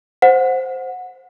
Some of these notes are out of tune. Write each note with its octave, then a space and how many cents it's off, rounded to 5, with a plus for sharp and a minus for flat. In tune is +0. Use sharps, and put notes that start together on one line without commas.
C5 +0 F#5 -20